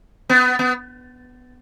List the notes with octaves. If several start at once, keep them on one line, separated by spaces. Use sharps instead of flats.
B3
B3